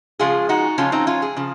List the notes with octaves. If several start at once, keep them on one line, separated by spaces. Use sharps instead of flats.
C#3 F3 G#3 F4 G#4
D#4 F#4
C#3 F3 G#3 C#4 F4
C4 D#4
C#4 F4
G#4
C#3 F3